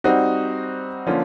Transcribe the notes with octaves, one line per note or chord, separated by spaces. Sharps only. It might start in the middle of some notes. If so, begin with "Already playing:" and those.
G3 C4 D#4 F#4
D3 F3 A#3 C#4 F4